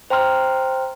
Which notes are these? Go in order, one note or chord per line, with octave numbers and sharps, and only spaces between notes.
C5 G5 A#5 C6 F6